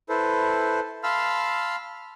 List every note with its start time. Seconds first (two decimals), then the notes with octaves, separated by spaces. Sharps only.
0.09 E4 A4 B4 C5
1.03 F5 A5 B5 C6 E6 F6